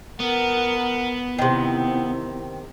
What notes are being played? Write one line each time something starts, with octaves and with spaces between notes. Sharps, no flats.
B3 A#4 F#5
C3 D#3 C4 E4